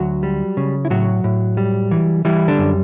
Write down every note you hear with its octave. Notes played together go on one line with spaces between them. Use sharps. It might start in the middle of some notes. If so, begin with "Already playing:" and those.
Already playing: D2 F#3 F#4
G3
C#3
E4
A2 F#3 F#4
A2
G3
E3
E3 G3 E4
D3 D4
F#2